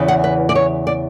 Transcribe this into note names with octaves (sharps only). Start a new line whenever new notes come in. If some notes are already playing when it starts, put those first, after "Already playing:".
Already playing: E2 C#3 E3
F#5
B4
D5
C#5
D5